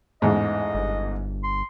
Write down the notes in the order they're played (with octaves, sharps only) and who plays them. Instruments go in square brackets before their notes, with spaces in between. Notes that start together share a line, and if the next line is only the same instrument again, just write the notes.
[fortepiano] A1 E2 G#2 [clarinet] D#5
[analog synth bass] G1
[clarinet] C6